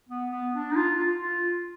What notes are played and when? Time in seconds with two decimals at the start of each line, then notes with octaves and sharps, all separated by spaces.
0.09 B3
0.31 B3
0.53 D4
0.71 D#4
0.76 F4
0.98 F4
1.21 F4